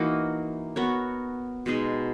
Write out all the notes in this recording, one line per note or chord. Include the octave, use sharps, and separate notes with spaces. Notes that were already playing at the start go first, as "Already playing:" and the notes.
Already playing: E3 A#3 D#4 F#4
B3 F#4 A#4 C#5
B2 G#3 D#4 G#4